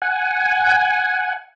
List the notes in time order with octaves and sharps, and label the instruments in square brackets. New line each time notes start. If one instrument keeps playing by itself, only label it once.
[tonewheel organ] F#5 G#5